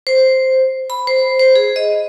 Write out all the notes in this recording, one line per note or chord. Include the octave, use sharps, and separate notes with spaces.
C5
B5
C5
C5
G#4
D#5